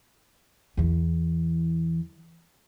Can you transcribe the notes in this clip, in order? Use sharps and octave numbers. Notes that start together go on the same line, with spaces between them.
E2 E3